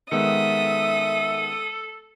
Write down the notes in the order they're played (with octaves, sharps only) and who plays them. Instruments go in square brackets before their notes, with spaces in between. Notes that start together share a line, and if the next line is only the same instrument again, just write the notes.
[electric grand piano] D#3 G#3 B3 [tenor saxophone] A4 [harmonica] E5 [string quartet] D#6